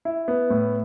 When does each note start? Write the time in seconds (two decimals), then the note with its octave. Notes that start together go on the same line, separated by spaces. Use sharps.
0.05 E4
0.28 B3
0.50 A2